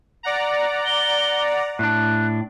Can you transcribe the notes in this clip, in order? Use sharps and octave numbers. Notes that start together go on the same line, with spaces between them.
D5 F#5 A#5
G7
A2 D4 F#6